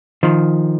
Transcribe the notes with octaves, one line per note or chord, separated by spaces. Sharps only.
D#3 F3